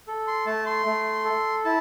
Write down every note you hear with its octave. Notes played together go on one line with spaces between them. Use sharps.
A4
C6
A3 A5
C6
A3
A4
E4 A5